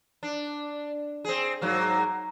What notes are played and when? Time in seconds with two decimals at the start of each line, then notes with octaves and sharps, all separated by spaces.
0.23 D4
1.25 C4 G#4
1.61 G#2 F#3 A#3